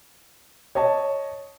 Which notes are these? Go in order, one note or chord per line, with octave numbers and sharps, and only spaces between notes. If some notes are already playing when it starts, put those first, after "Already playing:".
C#5 D#5 A5